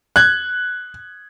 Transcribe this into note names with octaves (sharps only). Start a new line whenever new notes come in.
F#6 G#6